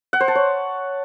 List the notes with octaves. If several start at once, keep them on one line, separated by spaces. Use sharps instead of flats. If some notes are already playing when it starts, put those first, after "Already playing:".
F#5
C5
A5
C#5